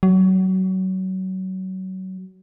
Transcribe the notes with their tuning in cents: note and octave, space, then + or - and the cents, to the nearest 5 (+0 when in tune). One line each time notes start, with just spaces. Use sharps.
F#3 +25